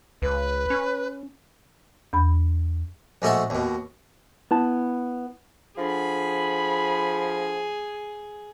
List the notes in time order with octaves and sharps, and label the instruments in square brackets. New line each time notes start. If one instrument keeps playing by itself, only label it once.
[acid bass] C#2 [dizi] B4
[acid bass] C#4
[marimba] E2 B5
[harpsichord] A#1 G#3 A3 F#4 A4 F#5
D#2 B2
[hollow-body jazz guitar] B3 E4 A5
[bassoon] F3 [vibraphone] D4 A4 F#5 [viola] G#4 [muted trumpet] B5